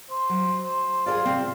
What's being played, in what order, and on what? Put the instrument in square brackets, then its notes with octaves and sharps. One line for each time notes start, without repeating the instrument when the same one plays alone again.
[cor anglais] C5
[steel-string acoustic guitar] F#3
[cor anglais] C5
[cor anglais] F4 [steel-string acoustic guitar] G#4 A4 D5
[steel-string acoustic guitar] C3 C4